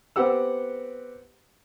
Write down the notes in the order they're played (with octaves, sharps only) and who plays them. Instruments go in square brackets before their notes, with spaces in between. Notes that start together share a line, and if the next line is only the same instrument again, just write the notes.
[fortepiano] B3 C4 G4 F#5 E6